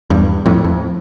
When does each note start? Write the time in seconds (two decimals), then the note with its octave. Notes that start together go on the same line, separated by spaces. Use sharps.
0.10 E2 G2
0.46 F2 A2
0.65 F2